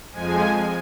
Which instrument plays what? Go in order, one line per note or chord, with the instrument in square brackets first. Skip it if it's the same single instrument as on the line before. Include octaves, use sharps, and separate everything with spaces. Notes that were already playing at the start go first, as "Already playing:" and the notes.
[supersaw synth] F2 F3 G#3 G#5